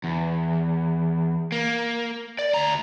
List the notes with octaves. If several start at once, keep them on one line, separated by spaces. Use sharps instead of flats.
E2
A#3
D5
D2 A#5